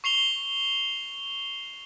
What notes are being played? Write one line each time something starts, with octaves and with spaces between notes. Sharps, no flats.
C#6 C7 F7 G7